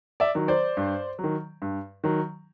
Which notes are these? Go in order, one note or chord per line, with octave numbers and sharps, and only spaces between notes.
D5 E5
D#3 F#3
C5 D5
G2
D#3 F#3
G2
D#3 F#3